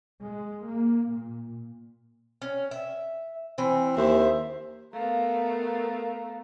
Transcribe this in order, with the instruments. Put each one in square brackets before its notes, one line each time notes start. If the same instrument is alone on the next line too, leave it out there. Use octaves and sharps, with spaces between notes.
[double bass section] G#3
A#3
A#2
[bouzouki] C#4
E5
[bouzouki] E3 [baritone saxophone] C4
[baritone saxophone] D#2 [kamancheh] C5 E5
[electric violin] A3 B3 [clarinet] A#4 [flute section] F5 A#5